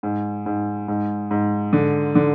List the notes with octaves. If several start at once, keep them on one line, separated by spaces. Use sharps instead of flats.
G#2
G#2
G#2
G#2
D3
D3